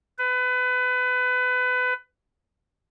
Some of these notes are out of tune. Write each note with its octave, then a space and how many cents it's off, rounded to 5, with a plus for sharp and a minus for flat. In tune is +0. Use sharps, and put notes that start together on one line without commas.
B4 +25